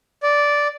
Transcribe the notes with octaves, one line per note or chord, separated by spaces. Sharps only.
D5